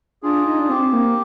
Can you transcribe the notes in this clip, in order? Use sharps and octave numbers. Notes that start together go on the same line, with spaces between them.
D4 F4 G#4
D#4
D4
C4 G4
A#3